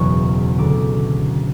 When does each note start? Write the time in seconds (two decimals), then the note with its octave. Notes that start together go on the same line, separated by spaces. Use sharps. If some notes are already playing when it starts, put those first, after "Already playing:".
Already playing: F#1 E2 B2 E3 C#6
0.58 D2 D3 D6